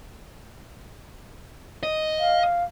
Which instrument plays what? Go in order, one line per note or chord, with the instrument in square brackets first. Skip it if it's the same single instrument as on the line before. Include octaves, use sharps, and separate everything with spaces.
[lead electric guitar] D#5
[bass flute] F5